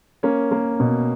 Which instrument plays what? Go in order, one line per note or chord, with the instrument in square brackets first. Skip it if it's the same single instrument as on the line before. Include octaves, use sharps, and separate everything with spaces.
[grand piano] A#3 C#4
A#3
B2